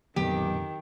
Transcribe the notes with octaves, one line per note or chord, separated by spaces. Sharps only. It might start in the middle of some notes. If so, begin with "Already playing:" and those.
A1 F2 A#2 D3 D#3 F#3 B3 G4